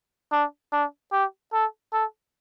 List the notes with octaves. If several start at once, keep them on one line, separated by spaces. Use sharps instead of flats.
D4
D4
G4
A4
A4